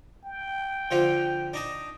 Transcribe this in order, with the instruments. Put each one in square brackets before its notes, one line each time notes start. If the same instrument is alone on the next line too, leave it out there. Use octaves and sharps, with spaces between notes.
[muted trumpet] G5
[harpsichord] D3 F3 F4
D4 D#4 A5